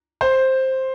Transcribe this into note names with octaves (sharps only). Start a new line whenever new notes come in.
C5